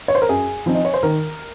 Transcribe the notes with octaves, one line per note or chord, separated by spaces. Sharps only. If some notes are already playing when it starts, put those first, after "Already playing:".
C#5
C5
A#4
F#2 G#4
F3 C4 D#4
D#5
C#5
C5
D#3 A#4